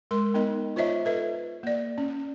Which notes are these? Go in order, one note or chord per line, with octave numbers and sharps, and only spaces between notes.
G#3 A#4 C6
B3 D#4 A#4 D#5
F4 C5 C#5 D#5 E5
A4 B4 E5
A#3 D5
C#4